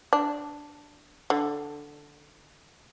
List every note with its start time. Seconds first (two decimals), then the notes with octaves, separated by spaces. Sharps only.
0.13 D4
1.30 D3